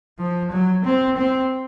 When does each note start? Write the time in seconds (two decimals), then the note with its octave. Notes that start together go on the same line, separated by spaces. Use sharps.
0.19 F3
0.51 F#3
0.85 C4
1.17 C4